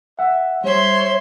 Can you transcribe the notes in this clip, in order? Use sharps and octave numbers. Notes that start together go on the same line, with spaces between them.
E5 F#5
G3 C5 C#5 E5 C6